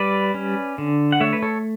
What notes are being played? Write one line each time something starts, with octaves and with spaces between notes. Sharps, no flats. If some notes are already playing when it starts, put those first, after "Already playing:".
Already playing: G3 B4 D5
C#4
D3
F#5
A3 C#5 E5
B4
A4 C#5